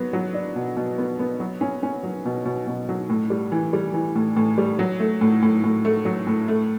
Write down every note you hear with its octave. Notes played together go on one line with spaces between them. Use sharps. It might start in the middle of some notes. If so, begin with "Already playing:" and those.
Already playing: F#3 B3
F#3
D4
B2
B2
B3
B3
F#3
C#4
C#4
F#3
B2
B2
B2
F#3
A2
G3
E3
G3
E3
A2
A2
G3
F#3
A3
A2
A2
A2
A3
F#3
A2
A3